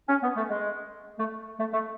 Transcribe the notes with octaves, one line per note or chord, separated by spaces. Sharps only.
C#4
B3
A3
G#3
A3
A3
A3